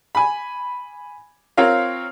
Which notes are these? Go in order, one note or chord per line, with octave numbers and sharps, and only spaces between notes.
G#5 B5
C4 F4 A#4 C#5 F5